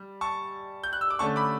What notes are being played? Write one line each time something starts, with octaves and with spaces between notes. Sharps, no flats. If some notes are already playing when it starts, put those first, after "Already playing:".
Already playing: G3
A5 C#6
G6
F#6
E6
D6
D3 A3 C#4 A5 C#6
B5 D6